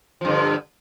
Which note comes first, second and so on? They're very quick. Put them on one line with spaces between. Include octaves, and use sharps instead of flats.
F3 G2 D3